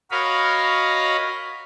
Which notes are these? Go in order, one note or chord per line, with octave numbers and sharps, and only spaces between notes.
F#4 A#4 C#5 D#5 F5 B5